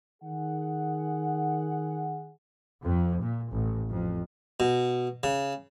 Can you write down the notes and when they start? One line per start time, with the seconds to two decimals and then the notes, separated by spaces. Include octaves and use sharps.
0.22 D#3 G#4 F#5
2.82 F2
3.21 A#2
3.51 A1
3.91 F2
4.60 B2
5.23 C#3